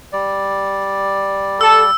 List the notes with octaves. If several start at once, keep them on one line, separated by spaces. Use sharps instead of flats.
G3 D5
A4 E6